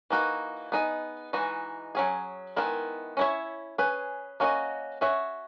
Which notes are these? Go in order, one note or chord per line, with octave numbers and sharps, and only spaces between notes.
E3 A#3 D#4 F#4
B3 D#4 G#4 B4 D#5
E3 G#3 D#4 F#4
F#3 C#4 G#4
D#3 G#3 B3 E4 A#4
C#4 E4 A#4 C#5 E5
C#4 G#4 B4
A#3 C#4 F#4 A#4 D#5
C#4 F#4 C#5 E5